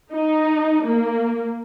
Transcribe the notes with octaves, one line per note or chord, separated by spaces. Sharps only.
D#4
A#3